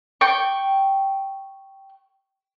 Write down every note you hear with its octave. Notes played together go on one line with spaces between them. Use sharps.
G5 C#6